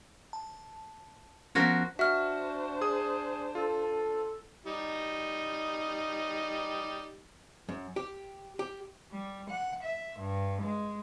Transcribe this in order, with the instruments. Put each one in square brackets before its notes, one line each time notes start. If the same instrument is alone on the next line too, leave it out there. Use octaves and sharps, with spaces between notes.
[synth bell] A5
[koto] F3 F#4 A#4 [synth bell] B3 C#4
[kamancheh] D4 C5 [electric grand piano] F#4 [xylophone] E5 F6
[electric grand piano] G#4 D#6
[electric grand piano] F4 [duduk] A4
[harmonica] G3 D#4
[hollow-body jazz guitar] F#2
G4
G4
[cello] G3
F#5
E5
G2
G#3